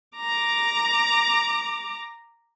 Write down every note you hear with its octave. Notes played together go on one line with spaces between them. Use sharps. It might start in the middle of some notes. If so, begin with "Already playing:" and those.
A#5 D6